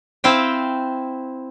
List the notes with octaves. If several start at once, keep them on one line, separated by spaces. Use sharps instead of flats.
C4 E4 F5 G5